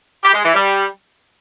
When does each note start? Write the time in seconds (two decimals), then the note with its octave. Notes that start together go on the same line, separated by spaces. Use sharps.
0.23 G4
0.33 G#3
0.44 E3
0.54 G3